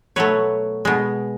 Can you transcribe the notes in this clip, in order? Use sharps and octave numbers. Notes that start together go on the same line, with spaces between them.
B2 F#3 A3 B4 C#5
B2 G#3